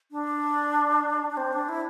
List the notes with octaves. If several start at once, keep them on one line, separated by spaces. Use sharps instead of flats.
D4
D4
C4
D4
E4